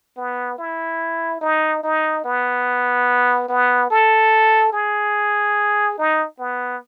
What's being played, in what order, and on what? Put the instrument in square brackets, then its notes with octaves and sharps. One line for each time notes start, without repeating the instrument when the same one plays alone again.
[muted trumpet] B3
E4
D#4
D#4
B3
B3
A4
G#4
D#4
B3